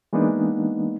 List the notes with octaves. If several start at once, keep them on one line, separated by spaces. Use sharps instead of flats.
E3 G#3 A#3 B3 D4 D#4